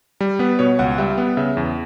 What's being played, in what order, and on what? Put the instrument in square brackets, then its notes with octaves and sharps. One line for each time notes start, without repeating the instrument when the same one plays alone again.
[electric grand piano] G3
B3 B4
B2 C#5
C#2 F#5
G3 E5
B3
C#3 E5
E2